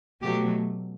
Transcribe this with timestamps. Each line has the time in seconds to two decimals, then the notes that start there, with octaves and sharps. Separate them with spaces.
0.22 B2 F#3 A3 G4